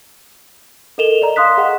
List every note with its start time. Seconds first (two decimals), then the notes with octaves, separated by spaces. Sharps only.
0.98 A4 A#4 D#5 E7 F7 G7
1.22 D5 D#5 A#5
1.36 F5 C6 D#6 F#6 B6
1.57 G#4 D#5 F#5